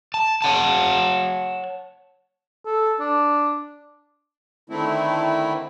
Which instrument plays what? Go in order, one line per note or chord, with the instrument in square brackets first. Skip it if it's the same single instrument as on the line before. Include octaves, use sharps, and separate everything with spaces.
[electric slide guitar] A5
C#5 F#5 A5
[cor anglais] A4
D4
[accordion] D3 D#3 A3 C4 E4